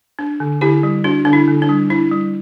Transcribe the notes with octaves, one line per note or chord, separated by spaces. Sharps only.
D4
D3
D3 E4 G4
G3
D4 F#4
D3 D4
E4
D3
D4
G3
D4 E4
G3